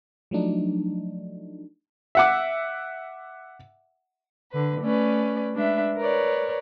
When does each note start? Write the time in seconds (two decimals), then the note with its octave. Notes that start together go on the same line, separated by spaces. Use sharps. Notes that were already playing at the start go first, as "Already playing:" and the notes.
0.31 F3 F#3 A3 D4 D#4
2.15 E5 F#5 D6
4.51 D3 B4
4.82 A3 C#4 B4 D5
5.53 G#3 D4 B4 E5
5.97 A#4 B4 C#5 D5